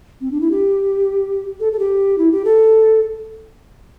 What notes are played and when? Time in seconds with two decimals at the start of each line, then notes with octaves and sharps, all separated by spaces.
0.21 C4
0.32 D4
0.41 E4
0.51 G4
1.60 A4
1.73 A4
1.79 G4
2.18 E4
2.32 G4
2.45 A4